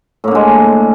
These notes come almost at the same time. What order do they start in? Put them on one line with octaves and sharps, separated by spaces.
A2 A#3 D3 G#3